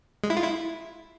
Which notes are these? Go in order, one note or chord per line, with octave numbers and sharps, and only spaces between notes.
G#3
E4
F4
E4